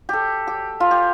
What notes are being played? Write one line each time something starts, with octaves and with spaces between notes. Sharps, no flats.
G4 A4
G4
F4
G4